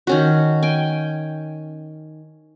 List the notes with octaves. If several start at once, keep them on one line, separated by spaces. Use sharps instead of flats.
D#3 C#4 F#4
G5 G#5